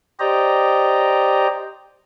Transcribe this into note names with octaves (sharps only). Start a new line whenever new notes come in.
G4 C5 D5 D#5 G5 A#5